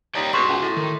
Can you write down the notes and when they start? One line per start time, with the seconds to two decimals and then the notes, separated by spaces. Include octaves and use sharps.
0.15 D#2 C#5 D5 G5
0.33 B2 F#4 G#4 C6 C#6
0.48 C#2
0.62 A2
0.77 D#3